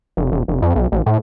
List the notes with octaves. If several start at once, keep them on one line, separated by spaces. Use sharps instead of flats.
F1
E1
F1
F2
B1
A1
A2